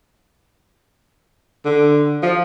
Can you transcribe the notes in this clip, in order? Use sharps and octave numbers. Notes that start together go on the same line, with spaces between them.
D3
F3